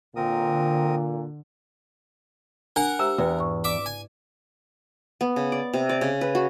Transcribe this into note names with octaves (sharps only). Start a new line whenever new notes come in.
A#2 D3 C4 A#4 D#6
D4 A#4 F#5
G4 C5 E5 A#5 E6
E2 G5
G#2 C#6
D5 E5 D6
G#5
B3
C#3
D5
C3
D5
C#3
B4
F#4